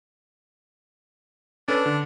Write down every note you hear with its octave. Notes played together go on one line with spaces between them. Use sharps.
C#4 D4 A4 B4
D3